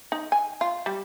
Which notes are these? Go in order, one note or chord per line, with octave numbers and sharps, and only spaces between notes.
D#4
G#5
F4
G3